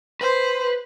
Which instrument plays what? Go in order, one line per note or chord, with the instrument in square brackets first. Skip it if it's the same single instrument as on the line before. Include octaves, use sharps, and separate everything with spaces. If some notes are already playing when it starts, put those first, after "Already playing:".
[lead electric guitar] B4 [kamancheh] C5